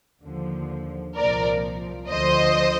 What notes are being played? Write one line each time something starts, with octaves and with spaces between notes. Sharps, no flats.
D#2 D3 F3
C2 A#2 F3 A#4 D5
D2 D3 F3 C5 D#5